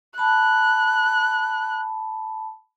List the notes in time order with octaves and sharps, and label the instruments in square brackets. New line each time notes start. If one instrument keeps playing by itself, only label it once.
[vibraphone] A5 B5 [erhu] F#6